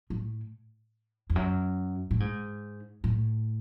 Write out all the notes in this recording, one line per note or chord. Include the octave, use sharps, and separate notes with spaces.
A2
F2
F#2
A2
G#2
A2